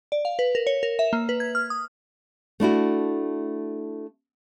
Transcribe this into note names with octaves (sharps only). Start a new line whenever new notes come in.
D5
F5
B4
A#4
C#5
A#4
E5
A#3
B4
G#6
F6
D#6
A3 D4 E4 F#4